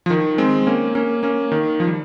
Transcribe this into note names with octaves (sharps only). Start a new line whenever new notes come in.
F3
D#3
G#3 C4
A#3 C#4
A#3 C#4
A#3 C#4
D#3
F3
G3